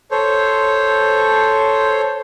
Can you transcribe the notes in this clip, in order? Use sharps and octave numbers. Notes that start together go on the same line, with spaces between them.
A4 C5 C#5